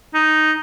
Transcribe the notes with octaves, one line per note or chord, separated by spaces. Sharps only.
D#4